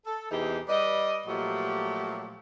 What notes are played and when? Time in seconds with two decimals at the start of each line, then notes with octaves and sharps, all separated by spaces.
0.06 A4
0.30 E2 C3 E3 D#4 G4 G#4
0.69 G3 B4 D5 D#5
1.26 A#2 F3 F#3 A3 G4